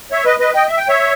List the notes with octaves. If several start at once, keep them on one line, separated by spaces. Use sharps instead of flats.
C#5 E5
B4 D#5
B4 D#5
D#5 G5
E5
G5
C#5 E5